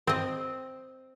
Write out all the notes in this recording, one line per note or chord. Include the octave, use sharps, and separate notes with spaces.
C4 D#5